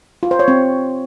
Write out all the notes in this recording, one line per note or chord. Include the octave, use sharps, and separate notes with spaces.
F4
C5
C#5
C4